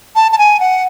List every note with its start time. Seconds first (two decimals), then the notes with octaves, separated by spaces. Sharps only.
0.16 A5
0.32 A5
0.38 G#5
0.60 F#5